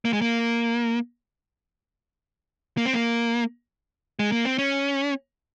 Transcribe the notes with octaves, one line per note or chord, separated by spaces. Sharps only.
A#3
G#3
A#3
A#3
C4
A#3
G#3
A#3
C4
C#4